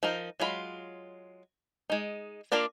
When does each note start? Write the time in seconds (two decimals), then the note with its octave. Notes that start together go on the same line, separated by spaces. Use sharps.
0.03 F3 D#4 A#4
0.40 F#3 G#3 F4 B5
1.90 G#3 D#4
2.52 A#3 D4 F4 A#4 D5